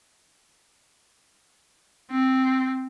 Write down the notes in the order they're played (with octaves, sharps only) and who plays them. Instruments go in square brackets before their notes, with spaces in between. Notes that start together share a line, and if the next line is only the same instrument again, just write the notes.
[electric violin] C4